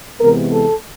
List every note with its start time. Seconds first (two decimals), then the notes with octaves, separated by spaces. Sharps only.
0.21 C3 E3 G#3 B3 A#4
0.53 A4